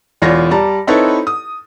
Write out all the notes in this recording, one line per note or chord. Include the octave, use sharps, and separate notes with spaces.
E1 E2 F4 C#5 D5 A#6
G3 D5 A5 A#5
C4 D#4 E4 A4 B4 C#5
D#6